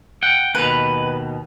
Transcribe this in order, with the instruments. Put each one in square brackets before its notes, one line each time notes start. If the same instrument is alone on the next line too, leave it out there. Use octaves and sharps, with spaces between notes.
[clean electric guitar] F#5 G5
[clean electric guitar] D#2 B2 [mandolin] B4